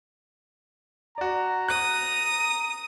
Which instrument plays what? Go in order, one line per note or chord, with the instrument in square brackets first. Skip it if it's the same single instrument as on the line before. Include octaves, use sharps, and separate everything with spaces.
[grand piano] F#4 D5 [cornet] A#5
[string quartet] D#6 [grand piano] F#6